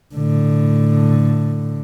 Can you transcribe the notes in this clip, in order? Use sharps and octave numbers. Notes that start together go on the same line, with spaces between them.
A2 D3